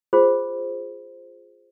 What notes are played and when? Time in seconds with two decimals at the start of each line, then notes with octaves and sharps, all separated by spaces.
0.13 F4 G#4 C5